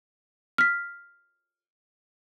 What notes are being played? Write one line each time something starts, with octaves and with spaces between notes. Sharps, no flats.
F6 B6